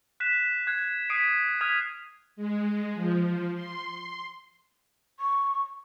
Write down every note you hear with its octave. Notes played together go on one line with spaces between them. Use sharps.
F#6 B6 E7
F#6 G#6 C7
D#6 B6 C7 D7 D#7
D#6 F6 G#6 B6 D#7 F7
G#3
F3
C6
C#6